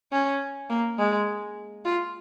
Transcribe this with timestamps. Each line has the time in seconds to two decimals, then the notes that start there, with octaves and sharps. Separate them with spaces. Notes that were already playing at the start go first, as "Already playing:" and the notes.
0.12 C#4
0.70 A#3
0.98 G#3
1.85 F4